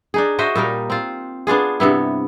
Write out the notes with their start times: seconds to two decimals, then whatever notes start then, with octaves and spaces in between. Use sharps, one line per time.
0.14 D4 D#4 G#4
0.39 F#4 C5 D#5 E5
0.55 A#2 G3 D#4 A#4
0.90 C4 F4
1.47 B3 D4 F4 G#4
1.80 G2 C3 B3 E4